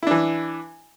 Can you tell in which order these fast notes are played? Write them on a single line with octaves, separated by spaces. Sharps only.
E4 D4 E3